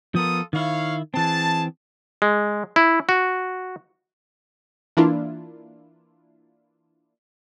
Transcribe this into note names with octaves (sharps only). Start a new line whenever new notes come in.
F3 B3 F4 A4 A#4 D#6
D#3 E4 C#5 F5
E3 C4 G#4 A5
G#3
E4
F#4
E3 A#3 D4 E4 F4